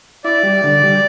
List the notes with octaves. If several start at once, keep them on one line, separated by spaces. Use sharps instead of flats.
E4 D5
G3
D3
G3